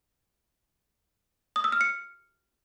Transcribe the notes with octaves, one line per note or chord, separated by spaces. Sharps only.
D#6
E6
F6
C#7